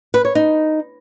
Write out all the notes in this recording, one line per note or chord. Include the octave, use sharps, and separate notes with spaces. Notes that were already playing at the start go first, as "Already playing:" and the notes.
B4
C#5
D#4